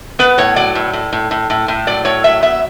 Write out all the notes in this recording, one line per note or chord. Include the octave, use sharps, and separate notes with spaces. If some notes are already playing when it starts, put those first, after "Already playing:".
B3 B4
A2 C#5
F#3 D5
A2
A2
A2
A2
A2
A2
F#3 D5
A2 C#5
F#3 E5
B3 E5